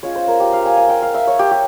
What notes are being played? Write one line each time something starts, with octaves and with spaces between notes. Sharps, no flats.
G#3 C#4 F4 C#5
C5
A#4
G4
F5
G#5
G#5
G5
F5
E5
C#5
G4
G4